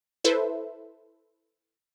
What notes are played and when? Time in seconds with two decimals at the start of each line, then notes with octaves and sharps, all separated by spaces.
0.24 E4 A4 B4 C5 E5